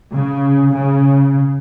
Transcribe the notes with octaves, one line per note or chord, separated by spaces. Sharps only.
C#3
C#3